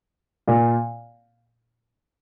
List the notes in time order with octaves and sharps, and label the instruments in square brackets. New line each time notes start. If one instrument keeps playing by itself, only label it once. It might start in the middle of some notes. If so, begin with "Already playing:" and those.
[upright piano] A#2